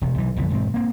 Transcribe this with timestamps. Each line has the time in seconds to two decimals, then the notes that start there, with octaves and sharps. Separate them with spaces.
0.01 E1 C3
0.18 B1 E3
0.37 B1 F2 D3 E3
0.50 E1 G#2 C4
0.74 A#3 C4